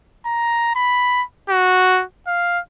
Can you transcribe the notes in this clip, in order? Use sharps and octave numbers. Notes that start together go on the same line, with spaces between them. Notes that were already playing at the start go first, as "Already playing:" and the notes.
A#5
B5
F#4
F5